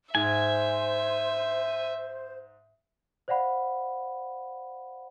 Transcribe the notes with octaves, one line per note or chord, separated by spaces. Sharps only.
G#2 C5 E5 G#5
C5 D5 F5 F#5 B5